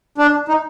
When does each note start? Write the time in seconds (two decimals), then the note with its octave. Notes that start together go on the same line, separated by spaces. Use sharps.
0.18 D4
0.48 D#4